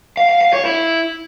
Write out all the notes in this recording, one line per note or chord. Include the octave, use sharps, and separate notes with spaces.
F5
F5
F5
C#5
E4